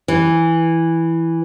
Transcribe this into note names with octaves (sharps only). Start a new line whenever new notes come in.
E3